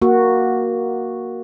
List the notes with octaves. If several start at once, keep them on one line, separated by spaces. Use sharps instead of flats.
A#3 F#4